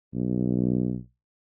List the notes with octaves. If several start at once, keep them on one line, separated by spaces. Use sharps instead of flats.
B1